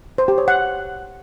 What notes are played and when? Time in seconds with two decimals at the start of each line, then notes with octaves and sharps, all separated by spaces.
0.18 C5
0.28 G4
0.38 C#5
0.48 F#5